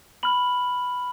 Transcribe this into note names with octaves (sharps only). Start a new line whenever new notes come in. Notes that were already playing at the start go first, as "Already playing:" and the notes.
B5 F6 F#7